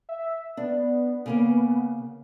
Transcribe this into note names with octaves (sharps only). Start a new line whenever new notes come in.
E5
B3 D4
C#3 A#3 C#4